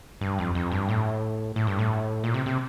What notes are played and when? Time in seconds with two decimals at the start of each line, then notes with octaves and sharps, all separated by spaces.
0.21 G2
0.39 F2
0.55 F2
0.72 G2
0.89 A2
1.56 A2
1.67 G2
1.79 A2
2.24 A#2
2.34 C3
2.46 C3